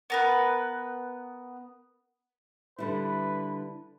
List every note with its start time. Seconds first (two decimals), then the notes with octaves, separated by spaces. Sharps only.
0.10 B3 A#4 B4
2.78 D3 G3 E4 B4